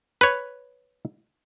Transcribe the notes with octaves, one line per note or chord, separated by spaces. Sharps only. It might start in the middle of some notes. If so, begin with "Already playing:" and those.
B4 C#5